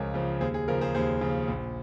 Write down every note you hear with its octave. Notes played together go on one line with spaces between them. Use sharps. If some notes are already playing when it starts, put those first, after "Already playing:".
Already playing: C#2 C#3 F3 A#4 C#5 F5 G#5
C#3 F3
D#2 G#4 C5
G#4
C#3 F3 A#4
G#4 C5
D#2 G#4 C5
C#3 F3
A#1